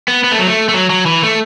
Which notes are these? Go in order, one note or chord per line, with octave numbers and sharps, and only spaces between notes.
B3
B3
A3
F#3
A3
A3
F#3
F#3
E3
A3